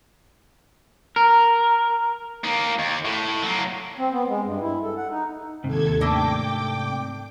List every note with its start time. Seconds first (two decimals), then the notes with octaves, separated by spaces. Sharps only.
1.16 A#4
2.44 A#3 D#4
2.79 D#2
3.05 A2
3.43 F#3 A#3
3.98 C4
4.12 B3
4.28 G#3
4.44 G2
4.61 E4
4.83 A4
4.97 F#5
5.11 D#4
5.64 D#2 G#2 C3 A4 G#6
6.01 A3 A#3 D4 G5 D6